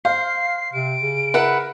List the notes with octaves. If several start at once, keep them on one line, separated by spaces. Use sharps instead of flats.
C5 F5 C7
C3 D7
C#3
E4 A#4 B4 F#5